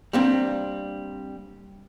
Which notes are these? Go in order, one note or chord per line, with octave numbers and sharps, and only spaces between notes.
G3 A#3 C4 D4